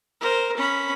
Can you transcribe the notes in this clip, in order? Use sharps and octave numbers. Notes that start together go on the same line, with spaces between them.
A#4 C5
C#4 B5